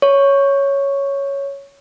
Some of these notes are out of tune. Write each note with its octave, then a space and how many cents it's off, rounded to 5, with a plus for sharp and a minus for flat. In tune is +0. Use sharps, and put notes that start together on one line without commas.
C#5 +0 C#6 +0